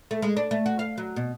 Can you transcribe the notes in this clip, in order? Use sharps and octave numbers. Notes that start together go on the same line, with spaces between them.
A3
G#3
D4
A3
F#4
F5
F#3
B2